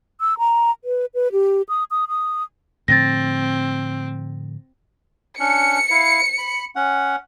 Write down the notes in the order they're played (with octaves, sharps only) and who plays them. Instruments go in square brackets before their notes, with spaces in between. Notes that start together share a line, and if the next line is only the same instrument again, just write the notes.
[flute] E6
A#5
B4
B4
G4
D#6
D#6
D#6
[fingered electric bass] A2 D3 F3 [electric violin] C4 [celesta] A6 A#6
[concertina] C#4 D4 [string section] C#7
[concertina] E4 F5
B5
C#4 F#5